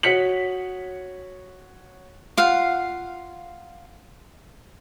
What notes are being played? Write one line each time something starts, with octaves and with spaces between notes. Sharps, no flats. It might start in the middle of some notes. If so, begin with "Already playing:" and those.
F#4 C#5 B6 C#7 F#7
F4 F5 F#5